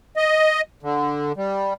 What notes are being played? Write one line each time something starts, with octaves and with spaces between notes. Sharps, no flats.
D#5
D3
G3